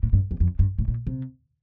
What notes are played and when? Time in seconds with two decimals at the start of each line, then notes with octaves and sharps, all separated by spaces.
0.03 A2
0.13 G2
0.31 E2
0.40 F2
0.59 G2
0.79 A2
0.88 A#2
1.07 C3